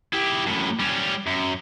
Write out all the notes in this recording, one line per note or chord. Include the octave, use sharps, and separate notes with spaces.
E4 G4
F#2 A2
G3 C#4
F#2